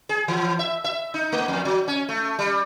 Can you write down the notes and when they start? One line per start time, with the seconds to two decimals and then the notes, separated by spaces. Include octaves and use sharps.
0.09 G#4
0.28 E3
0.59 E5
0.84 E5
1.14 D#4
1.32 A3
1.48 F2
1.65 F#3
1.88 C#4
2.09 A3
2.39 G3